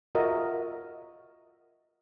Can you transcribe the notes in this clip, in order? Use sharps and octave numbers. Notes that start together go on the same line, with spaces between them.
F4 F#4 A#4 D#5 E5